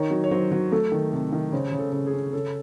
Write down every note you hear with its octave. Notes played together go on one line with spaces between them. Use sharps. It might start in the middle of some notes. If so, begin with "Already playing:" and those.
Already playing: D#3 D#4 C#5
F#3
C#5
F#3 C5
F#3
A3 A4
D#3
C3 A4
D#3
C#3 C5
C#3
A4
C#3
G#4
C#4
C#3 A4